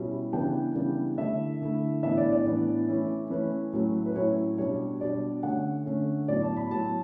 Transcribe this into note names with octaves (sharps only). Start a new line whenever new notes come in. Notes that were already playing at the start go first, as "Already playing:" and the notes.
Already playing: B2 G3 C#4 E4
C#3 E3 G3 B3 D4 G5
C#3 E3 G3 B3 D4
D3 A3 E4 E5
D3 A3 E4
A2 E3 B3 D4 E5
D5
D5
A2 E3 B3 D4
E3 A3 C#4 E4
E3 A3 C#4 E4 B4
A2 F#3 A3 C#4 E4
B4
A2 F#3 A3 C#4 E4 C#5
B2 G3 D4 C#5
B2 G3 D4 D5
D3 A3 C#4 F#5
D3 A3 C#4
A2 F#3 B3 D5
A5
B5
A2 F#3 B3 A5